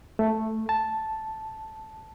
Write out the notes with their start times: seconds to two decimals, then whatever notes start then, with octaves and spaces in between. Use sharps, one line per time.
0.19 A3
0.69 A5